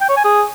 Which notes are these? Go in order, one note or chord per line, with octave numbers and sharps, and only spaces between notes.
G5
C#5
G#5
G#4